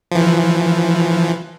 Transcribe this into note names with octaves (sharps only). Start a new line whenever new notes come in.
E3 F3